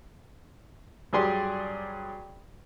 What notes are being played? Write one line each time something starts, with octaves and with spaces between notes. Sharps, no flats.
G2 F#3 G4 G#4 D5 C6